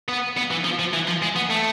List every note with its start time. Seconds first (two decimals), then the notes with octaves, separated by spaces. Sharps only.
0.08 B3
0.37 B3
0.51 E3
0.64 F3
0.79 F3
0.93 E3
1.07 F3
1.22 G#3
1.36 B3
1.50 A3